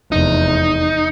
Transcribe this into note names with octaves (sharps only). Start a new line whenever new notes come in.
F1 E2 D#4